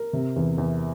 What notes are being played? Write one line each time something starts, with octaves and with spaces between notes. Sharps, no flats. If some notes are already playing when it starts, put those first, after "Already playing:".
Already playing: A#4
C3
E2
E2